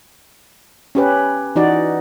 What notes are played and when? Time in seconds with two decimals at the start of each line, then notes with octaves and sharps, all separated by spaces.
0.95 C#4 G4 B4
1.56 E3 D#4 F#4 D5